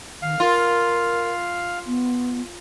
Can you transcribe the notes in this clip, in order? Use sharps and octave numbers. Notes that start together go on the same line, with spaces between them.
D#3 F5
F4 A#4
B3